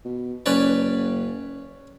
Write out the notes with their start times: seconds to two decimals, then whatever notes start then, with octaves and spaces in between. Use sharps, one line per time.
0.05 B2
0.46 F#1 C#4 B4 D5